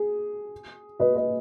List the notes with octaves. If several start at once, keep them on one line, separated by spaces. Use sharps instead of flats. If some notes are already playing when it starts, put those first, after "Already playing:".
Already playing: G#4
B4 D#5
B4 D#5